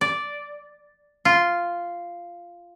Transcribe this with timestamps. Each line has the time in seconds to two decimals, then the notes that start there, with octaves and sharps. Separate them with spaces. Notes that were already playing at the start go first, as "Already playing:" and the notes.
0.01 D5
1.25 F4